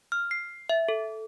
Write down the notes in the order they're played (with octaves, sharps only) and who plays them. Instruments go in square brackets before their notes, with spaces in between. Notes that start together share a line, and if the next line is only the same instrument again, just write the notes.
[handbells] F6
C7
E5
A4